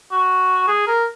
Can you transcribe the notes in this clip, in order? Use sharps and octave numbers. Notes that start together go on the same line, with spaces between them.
F#4
G#4
A#4